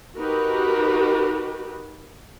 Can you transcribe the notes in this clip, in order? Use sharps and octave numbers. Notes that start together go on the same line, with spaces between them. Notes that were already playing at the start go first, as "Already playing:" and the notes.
D#4 F#4 G4 A#4 B4